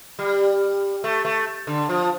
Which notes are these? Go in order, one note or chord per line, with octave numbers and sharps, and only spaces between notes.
G3
A3
A3
D3
F3